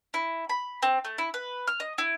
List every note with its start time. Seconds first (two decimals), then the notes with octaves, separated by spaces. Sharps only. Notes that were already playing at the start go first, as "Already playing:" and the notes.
0.14 E4
0.50 B5
0.83 C4
1.05 A3
1.18 E4
1.34 B4
1.67 F6
1.80 D#5
1.98 E4